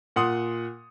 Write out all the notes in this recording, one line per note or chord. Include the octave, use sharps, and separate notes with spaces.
A#2 F#5 C6 D#6